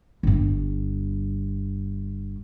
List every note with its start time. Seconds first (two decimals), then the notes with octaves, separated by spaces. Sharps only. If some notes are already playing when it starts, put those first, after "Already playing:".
0.23 G1 G2